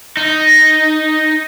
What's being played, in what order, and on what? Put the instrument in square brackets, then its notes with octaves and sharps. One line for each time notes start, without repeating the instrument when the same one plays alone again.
[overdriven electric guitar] D#4